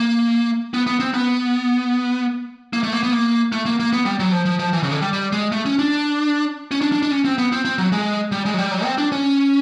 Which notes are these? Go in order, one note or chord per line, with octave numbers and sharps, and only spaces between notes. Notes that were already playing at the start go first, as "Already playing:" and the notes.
Already playing: A#3
B3
B3
C4
B3
A#3
A3
A#3
B3
A#3
A3
A#3
A#3
B3
G3
F#3
F3
F3
F3
E3
C#3
D3
G3
G3
G#3
A3
C#4
D4
C#4
D4
D4
D4
C#4
C4
B3
C4
C4
F#3
G#3
G3
G#3
F#3
G3
F#3
C4
D4
C#4